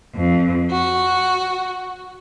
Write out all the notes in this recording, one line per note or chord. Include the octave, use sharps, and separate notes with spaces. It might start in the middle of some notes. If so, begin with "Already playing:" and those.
F2
F#4